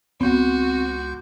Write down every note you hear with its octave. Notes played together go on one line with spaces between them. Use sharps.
C#2 B3 C4 F#4 G6